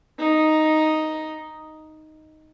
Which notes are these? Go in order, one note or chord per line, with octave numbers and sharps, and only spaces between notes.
D#4